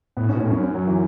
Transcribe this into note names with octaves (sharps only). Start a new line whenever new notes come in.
A2 B3
G#2 C#4
B2
A2 C#4
F#2 C#4
C#4
F#3
E3